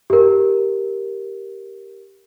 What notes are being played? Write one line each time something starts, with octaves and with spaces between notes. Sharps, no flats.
G4 A#4